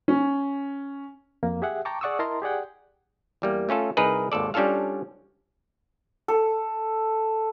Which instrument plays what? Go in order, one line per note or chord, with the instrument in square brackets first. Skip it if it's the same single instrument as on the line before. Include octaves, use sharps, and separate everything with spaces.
[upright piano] C#4
[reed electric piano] F2 A#3
G4 G#4 E5 F#5
G5 A5 A#5 C#6 D6
G#4 D5 F#5 C#6 D#6 E6
E4 A#4 D#5 A5 A#5 C6
G4 G#4 D5 F#5 G5
[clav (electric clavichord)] E2 G3 A#3
A3 C#4 F4 A4
C2 D#4 G#4 A#4 B4
G#1 D#2 A4 D5
G3 C#4 D4 F4 A4 F5
[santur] A4